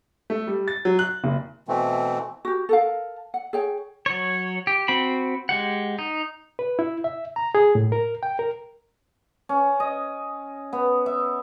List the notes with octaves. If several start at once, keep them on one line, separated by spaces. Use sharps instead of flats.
A3
G3
A6
F#3
F#6
F#1
B2 E3 A3 C4
F#4 G4
A4 A#4 F5
F#5
G#4 C#5 G5
F#3 C#5
G4
C4 F#4 G5 B5
G#3 G4 F#5
D#4
B4
E4
E5
A#5
G#4
A2
A#4
G5
A#4
C#4
D#5
B3
E5